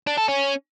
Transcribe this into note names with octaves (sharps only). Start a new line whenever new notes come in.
D4
A4
C#4